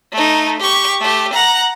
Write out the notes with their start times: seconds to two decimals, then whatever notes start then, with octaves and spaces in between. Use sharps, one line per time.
0.13 A3 D#4
0.60 G4 C#6
1.01 A3 G4
1.33 F#5 A#5